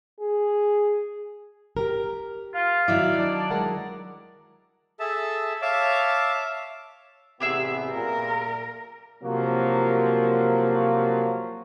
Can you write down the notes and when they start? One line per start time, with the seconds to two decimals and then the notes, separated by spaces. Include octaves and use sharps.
0.20 G#4
1.77 G4 A#4
2.55 F4 F5
2.88 D#3 F#3 E4 D5
3.19 D4
3.50 G#3 A#4 F#5
5.00 G#4 A4 E5 A5
5.62 C#5 E5 F5 A5 D6
7.40 A1 C3 B3 G4 G#4 E5
7.92 A#2 A#4
9.23 C3 F3 F#3 A#3